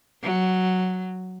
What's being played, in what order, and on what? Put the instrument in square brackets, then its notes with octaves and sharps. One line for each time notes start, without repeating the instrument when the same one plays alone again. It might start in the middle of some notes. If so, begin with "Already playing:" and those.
[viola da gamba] F#3